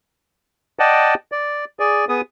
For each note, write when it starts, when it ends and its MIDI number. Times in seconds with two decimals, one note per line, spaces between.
0.79 1.14 74
0.79 1.14 75
0.79 1.14 78
0.79 1.14 79
0.79 1.14 81
1.32 1.65 74
1.80 2.05 68
1.80 2.05 74
2.09 2.21 59
2.09 2.21 68
2.09 2.21 87